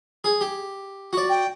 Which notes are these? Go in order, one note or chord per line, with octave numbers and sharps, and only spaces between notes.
G#4
G4
F#4 D5
G5